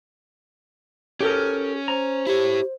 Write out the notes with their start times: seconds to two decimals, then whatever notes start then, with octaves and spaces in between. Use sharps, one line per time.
1.21 C#4 G4 A4 A#4
1.88 C5 A#5
2.27 E4 G4 C#5